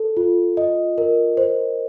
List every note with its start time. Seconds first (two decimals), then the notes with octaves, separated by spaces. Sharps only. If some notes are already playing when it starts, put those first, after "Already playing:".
Already playing: A4
0.17 F4
0.57 D#5
0.98 A#4
1.37 C5